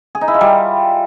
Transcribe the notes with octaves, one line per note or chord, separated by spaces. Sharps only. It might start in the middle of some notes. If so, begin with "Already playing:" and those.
G#4
D#4
E4
F4
G3